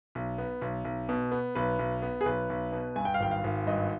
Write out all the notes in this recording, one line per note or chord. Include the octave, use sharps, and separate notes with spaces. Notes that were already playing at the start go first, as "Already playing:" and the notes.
B1
B3
B1
B1
B2
B3
B1 B4
B1
B3
G#4
B1 B4
B1
B2
G2 G#5
G5
F5
G#1 G5
F5
G#1
G2 D#5